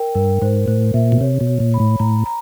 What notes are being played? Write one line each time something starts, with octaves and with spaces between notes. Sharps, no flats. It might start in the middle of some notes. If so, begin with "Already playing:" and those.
Already playing: A#4 G5
G2 A#4
G#2 C5
A2 C5
A#2 E5
B2
C3 C#5
B2
C#5
A#2
B5
A2
A2 A#5
A#5